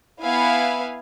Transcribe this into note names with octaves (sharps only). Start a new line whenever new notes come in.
B3 E4 B4 F5 G#5